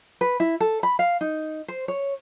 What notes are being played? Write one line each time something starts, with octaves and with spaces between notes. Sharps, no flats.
B4
E4
A4
B5
F5
D#4
C5
C#5